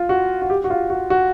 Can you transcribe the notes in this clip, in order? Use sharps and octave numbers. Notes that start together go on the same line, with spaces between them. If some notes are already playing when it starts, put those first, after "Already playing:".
Already playing: F4
F#4
F#4
G4
F#4
F4
F#4
F#4